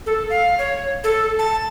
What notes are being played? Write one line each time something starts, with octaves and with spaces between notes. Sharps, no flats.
A4
F5
C#5
A4
A5